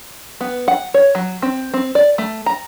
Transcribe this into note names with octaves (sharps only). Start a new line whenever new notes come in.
B3
F#5
C#5
F#3
C4
C4
D5
A3
A#5